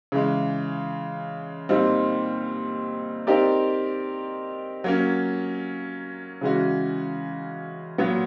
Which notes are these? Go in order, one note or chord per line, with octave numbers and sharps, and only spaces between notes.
C#3 E3 G#3
A#2 G3 C4 D#4
C4 D#4 G4 A#4 D5
F#3 A#3 C#4
C#3 E3 G#3 C#4 F#4
A#2 F#3 B3